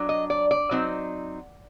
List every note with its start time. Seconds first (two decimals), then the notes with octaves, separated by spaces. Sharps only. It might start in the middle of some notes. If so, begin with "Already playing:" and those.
Already playing: F#3 D4
0.09 D#5
0.30 D5
0.51 D5
0.71 F#3 C4 D#4